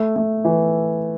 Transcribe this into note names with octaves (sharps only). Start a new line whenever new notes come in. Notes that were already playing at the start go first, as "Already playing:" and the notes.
Already playing: A3
A3
E3